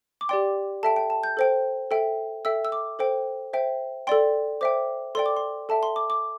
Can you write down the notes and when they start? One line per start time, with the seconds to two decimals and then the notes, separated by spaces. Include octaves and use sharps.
0.21 D6
0.29 G4 D5 G5 C6
0.83 A4 E5 G5 A5
0.96 G5
1.10 A5
1.23 G6
1.37 A4 C5 G5
1.91 A4 E5 G5
2.45 A4 E5 G5 E6
2.65 E6
2.72 D6
2.99 A4 C5 G5
3.53 C5 E5 G5
4.07 A4 D5 G5 C6
4.61 C5 E5 G5 D6
5.15 A4 D5 G5 C6
5.26 D6
5.37 C6
5.69 A4 E5 G5 A5
5.83 C6
5.96 D6
6.10 D6